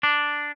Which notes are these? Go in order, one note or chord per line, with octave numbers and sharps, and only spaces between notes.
D4